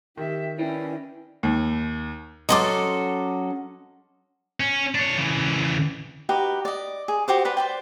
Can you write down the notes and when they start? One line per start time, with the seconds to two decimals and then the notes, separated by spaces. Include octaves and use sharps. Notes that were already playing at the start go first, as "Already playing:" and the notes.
0.17 D#3 G4 E5
0.58 C#4 E4 B4 D5 G5
1.43 D#2
2.49 F#3 C#4 A4 D#5 C6 D6
4.60 C#4
4.95 D4 C#5
5.17 C#3 E3
6.29 D#4 F#4 G4 B4
6.65 D5 D#5
7.08 G#4
7.28 F#4 G4 C5 D6
7.45 B4 C5 D5 F#5
7.57 C5 D5 G5